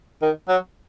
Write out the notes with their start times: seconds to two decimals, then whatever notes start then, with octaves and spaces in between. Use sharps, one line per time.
0.22 D#3
0.48 F#3